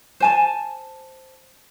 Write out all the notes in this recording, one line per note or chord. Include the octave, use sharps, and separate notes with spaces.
C5 G#5 A5